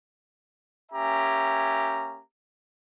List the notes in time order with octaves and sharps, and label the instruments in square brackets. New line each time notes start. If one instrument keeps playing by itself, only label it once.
[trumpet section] A#3 C#4 G4 E5 G#5 A#5